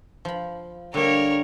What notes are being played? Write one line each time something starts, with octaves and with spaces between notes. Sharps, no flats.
F3 B5
D3 G3 A#3 A#4 C#5